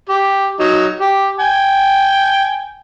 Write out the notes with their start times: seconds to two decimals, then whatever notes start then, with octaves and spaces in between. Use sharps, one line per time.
0.09 G4
0.60 F#3 D#4
1.01 G4
1.40 G5 G#5